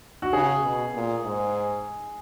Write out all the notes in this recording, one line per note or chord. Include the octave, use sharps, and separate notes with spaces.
F#4
C#3 G#4
B2
A#2
G#2